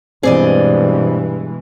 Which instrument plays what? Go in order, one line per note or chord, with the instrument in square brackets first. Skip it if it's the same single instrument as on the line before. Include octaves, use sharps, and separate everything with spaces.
[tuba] G2 [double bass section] B2 E3 G#3 [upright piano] C4 [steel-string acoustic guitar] G#4 D5 D#5